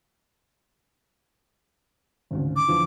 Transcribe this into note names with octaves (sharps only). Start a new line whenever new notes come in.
G#1 D2 C#3
D6
E2 D3 F3